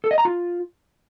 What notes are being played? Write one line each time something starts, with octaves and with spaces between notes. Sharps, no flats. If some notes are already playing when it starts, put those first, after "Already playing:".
A4
D#5
A#5
F4